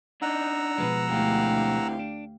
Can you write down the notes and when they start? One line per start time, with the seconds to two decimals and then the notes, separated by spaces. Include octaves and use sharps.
0.22 D4 D#4 F#5 A#5 E6
0.78 B2 F3 G#3 B4
1.10 D2 C3 E3 G4 F5
1.99 D4